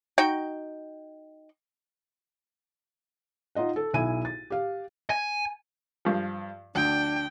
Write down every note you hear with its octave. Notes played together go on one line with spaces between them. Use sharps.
D#4 F#4 G5
D#4 F4 D#5 F#5
A4
B1 E4 E5 G#5 D#7
A6
G4 F5
G#5
G2 F3
D2 D4 G5